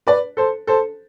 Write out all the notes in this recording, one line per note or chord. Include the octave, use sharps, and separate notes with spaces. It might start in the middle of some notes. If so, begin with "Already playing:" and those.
B4 D5
A4 C5
A4 C5